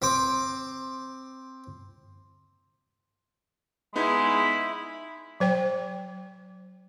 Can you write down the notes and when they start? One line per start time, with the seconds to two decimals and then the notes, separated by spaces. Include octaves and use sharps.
0.02 C4 C5 D6
3.96 G#3 B3 D#4 E4 G#4 B5
5.40 F#3 C5 G5